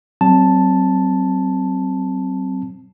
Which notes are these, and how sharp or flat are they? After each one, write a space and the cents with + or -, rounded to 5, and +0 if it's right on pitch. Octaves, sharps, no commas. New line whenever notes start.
F#3 +40 C4 +0 A5 +0